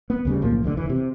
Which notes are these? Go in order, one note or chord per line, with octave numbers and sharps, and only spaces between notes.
B3
D2 C#3 G3
B1 A2 F3 A#3
F#1 D2 B2 D3
F1 E3
C3